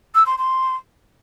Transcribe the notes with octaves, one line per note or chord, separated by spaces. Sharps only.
E6
C6
C6